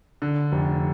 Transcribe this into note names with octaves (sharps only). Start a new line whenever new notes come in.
D3
F1